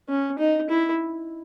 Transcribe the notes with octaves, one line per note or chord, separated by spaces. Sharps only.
C#4
D#4
E4